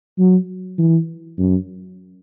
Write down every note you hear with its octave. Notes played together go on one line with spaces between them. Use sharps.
F#3
E3
F#2